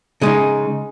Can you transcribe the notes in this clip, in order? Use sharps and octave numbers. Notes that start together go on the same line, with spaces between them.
C#3 G#3 D#4 G#4